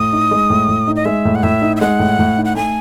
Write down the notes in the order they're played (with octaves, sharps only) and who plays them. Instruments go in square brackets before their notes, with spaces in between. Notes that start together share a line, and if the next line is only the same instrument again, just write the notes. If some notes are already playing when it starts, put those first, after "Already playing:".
Already playing: [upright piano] A2 [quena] D#6
[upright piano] D#4
G#3
A2
A2
D#4
[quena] D#5
[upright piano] G#3 [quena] E5
[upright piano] A2
[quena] F#5
[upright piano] A2 [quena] E5
[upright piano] D#4
[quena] E5
[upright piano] G#3 [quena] F#5
[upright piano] A2
A2
D#4
[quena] F#5
[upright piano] A3 [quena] G#5